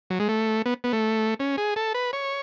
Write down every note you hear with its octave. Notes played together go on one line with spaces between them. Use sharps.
F#3
G#3
A3
B3
B3
A3
C#4
G#4
A4
B4
C#5